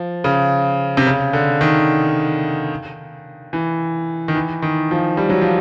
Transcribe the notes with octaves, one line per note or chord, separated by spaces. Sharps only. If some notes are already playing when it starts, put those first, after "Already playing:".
Already playing: F3
C#3
C3
C#3
D3
D#3
E3
D#3
E3
D#3
F3
G3
F#3
F3